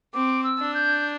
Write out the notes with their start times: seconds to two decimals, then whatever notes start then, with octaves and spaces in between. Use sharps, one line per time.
0.14 C4 D6
0.44 E6
0.59 D4
0.74 G6